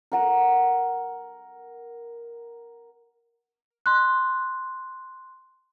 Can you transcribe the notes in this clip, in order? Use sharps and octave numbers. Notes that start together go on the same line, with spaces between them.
A#4 F#5 A#5
C6 F#6